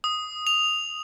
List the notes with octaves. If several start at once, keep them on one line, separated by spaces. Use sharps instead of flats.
D#6
F7